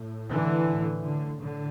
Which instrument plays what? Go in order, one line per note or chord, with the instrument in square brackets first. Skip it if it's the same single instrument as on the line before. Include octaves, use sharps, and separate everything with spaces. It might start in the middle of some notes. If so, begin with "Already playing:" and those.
Already playing: [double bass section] A2
D3 E3
A2
D3
A2 D3